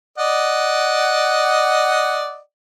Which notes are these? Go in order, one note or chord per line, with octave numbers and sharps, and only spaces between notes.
D5 D#5 F#5